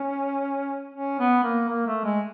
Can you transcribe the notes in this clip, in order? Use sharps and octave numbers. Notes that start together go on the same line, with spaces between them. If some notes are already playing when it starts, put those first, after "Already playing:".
Already playing: C#4
C#4
B3
A#3
A#3
A3
G#3